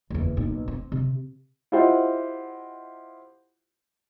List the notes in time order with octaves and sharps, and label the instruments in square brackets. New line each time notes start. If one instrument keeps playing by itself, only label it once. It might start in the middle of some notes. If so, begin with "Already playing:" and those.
[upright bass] F#1 E2
B1 A#2
C4
C3
[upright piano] E4 F4 G4 C5 D#5 F#5